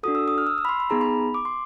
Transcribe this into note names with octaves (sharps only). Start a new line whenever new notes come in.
D4 F#4 A4 D#6
E6
D#6
F6
E6
E6
B5
C6
B5
B3 D#4 G#4 A#5
B5
D6
C6